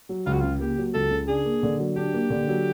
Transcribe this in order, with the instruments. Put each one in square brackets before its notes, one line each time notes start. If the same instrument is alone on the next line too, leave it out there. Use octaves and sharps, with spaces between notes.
[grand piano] F#3
[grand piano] C#2 [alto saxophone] F4
[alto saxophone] F#4
[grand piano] C#3 [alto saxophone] F4
[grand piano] A#3 [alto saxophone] G4
[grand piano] F#3
[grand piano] C#2 [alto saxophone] A4
[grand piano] C#3
[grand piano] D4 [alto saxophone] G#4
[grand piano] A#3
D3
F#3
[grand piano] D4 [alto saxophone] G4
[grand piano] A#3
D3
F#3